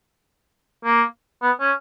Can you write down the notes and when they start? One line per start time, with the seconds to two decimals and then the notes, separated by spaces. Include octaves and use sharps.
0.85 A#3
1.43 B3
1.60 C#4